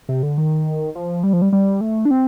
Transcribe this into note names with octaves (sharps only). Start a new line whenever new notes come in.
C3
D3
D#3
F3
G3
F3
G3
G3
A3
D4
C4